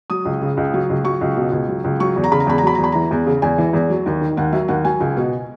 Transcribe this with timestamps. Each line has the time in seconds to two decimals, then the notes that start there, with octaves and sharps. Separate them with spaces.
0.10 F#3 D#6
0.25 C#2
0.41 C#3
0.57 C#2
0.74 F#3
0.90 C#2
1.04 F#3 C#6
1.21 C#2
1.37 B2
1.52 C#2
1.68 F#3
1.84 C#2
2.00 F#3 C#6
2.16 E2
2.24 A#5
2.31 C#3 B5
2.40 A#5
2.47 E2 B5
2.58 A#5
2.63 F#3 B5
2.75 E2 A#5
2.84 B5
2.92 E3 A#5
3.11 E2
3.26 C#3
3.42 E2 G#5
3.58 E3
3.73 E2
3.90 F#3
4.06 D#2
4.21 D#3
4.37 D#2 F#5
4.53 F#3 E5
4.68 D#2 F#5
4.85 F#3 G#5
5.00 C#2
5.17 B2